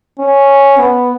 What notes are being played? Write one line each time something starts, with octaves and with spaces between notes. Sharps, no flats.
C#4
B3